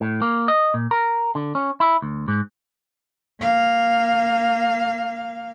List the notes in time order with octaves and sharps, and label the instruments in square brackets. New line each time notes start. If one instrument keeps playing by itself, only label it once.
[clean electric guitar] A2
A#3
D#5
A#2
A#4
D3
C#4
E4
D2
G#2
[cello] A#3 F5